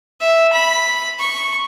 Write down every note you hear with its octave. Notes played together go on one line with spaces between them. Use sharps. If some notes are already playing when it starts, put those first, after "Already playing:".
E5
B5
C#6